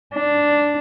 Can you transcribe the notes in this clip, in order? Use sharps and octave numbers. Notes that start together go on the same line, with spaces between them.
D4